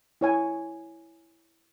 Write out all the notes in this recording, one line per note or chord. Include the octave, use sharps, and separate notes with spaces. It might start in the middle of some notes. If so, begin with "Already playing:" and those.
E4 C#5 G#5